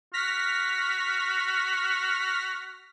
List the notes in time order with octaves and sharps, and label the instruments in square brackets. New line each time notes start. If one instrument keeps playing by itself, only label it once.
[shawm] F#4 [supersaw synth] F6 A#6 B6